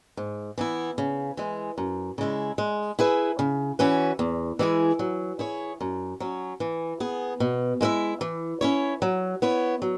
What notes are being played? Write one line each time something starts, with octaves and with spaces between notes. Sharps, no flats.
G#2
E3 B3 E4
C#3
E3 G#3
F#2
C#3 G#3 E4
G#3
E4 G#4 B4 E5
C#3
E3 C#4 F#4 B4
E2
E3 G#3 E4 G#4
F#3
E4 G#4 C#5
F#2
F#3 C#4
E3
B3 G#4
B2
G#3 E4 B4 E5
E3
C#4 E4 C#5
F#3
B3 E4 C#5
F#3